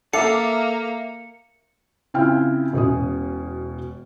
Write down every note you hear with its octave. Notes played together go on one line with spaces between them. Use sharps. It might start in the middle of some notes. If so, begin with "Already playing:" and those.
A#3 A4 E5 F5 D6 C#7
C#3 C4 E4 F4 G5 F6
E1 B2 C#4 D#6